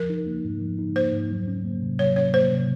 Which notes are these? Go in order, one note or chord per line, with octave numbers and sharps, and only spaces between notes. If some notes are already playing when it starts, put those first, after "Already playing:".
Already playing: F3 A#4
D#4
A#3
G#2
F3
D#4
A#3 C5
G#2
F#3
C#4
A#3
C3
F#3 C#5
C#4 C#5
A#3 C5
C3